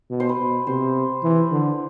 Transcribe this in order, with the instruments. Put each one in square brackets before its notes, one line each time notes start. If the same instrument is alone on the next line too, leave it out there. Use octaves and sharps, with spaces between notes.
[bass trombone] B2
[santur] C5
B4
[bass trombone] B2
[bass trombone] C3 [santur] C5
[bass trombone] E3
D3